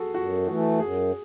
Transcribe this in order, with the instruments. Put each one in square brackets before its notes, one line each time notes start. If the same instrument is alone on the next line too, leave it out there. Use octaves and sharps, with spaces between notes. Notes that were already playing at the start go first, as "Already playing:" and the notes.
Already playing: [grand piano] F#4 G#4 A4
[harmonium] F#2 [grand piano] F#4
[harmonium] E3 A3 [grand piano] F#4
[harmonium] F#2 [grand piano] G#4